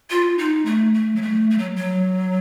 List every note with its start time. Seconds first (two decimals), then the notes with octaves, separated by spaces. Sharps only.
0.10 F4
0.38 D#4
0.66 A3
0.94 A3
1.16 F#3
1.22 A3
1.51 A3
1.58 F#3
1.76 F#3